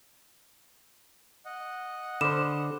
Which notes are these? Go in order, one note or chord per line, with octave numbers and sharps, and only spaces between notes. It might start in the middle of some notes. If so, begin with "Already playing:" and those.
D#5 F#5
D3 C5 B5 D6 F6 E7